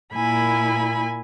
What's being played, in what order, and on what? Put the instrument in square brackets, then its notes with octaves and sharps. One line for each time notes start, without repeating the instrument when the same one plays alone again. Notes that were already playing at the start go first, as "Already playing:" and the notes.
[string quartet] A#2 A#3 E4 G#5 B5